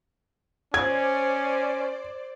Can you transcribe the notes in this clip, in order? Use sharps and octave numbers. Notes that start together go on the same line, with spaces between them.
C#4 C5 D5 G#6